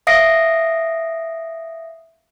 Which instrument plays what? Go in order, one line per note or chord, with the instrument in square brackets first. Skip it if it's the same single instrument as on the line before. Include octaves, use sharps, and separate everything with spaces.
[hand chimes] E5 F5 D#6 A#6 C7 D7